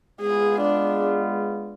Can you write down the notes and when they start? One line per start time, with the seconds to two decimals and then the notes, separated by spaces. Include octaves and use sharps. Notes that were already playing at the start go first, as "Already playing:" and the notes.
0.20 G#3 B3 F4 G#4
0.61 D4